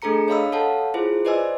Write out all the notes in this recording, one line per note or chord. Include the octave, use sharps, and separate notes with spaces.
A3 D4 G#4 A4 A#5 C#7
C#5 D#5 F5 B5 D#6 E6
A4 C#5 F5 F#5 A5
E4 F4 G#4 C5
B4 C5 D5 D#5 G#5 E6